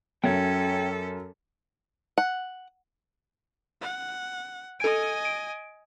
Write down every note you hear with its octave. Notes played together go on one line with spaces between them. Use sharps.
F#2 C#4 A4 C#5 E5 G5
F#5
F#5
A4 D#5 G#5 D7
D7